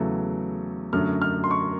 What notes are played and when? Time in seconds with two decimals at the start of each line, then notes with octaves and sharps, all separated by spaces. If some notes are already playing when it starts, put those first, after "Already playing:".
Already playing: E2 C#3 F#3 A3
0.93 F#2 D3 F#3 A3 F6
1.22 F6
1.44 C6
1.51 C#6